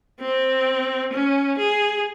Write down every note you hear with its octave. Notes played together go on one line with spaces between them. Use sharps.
C4
C#4
G#4